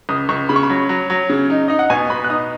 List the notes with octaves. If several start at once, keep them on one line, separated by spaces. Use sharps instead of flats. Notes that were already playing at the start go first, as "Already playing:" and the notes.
C#2 D#6
C#2 C#6
C#3 B5
C#6
B5
F#3
F#3
F#3
C#3
D#4
D#4 D#5
F#5
B2 G#5
B2 B5
F#6
D#4 D#6